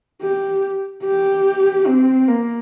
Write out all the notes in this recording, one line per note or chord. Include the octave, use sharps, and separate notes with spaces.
G4
G4
C4
A#3